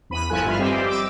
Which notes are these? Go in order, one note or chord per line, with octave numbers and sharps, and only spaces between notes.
E2 B5 D#7
G1 F3 E4 A4 G#5 F#6
G#1 G2 F4 B4 E5 F6
G3 C4 G4 C5 D#5 E5
D6 E6